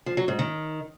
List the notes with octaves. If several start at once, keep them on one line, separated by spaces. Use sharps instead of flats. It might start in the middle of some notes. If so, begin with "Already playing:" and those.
F3
F#3
G#2
D#3